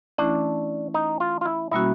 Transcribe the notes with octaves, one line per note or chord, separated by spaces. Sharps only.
E3 A3 C#4 D4 E4
D#4
F4
F4
E4
B2 G3 A#3 C#4 E4 F#4